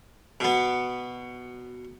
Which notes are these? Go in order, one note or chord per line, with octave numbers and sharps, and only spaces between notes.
B2 B3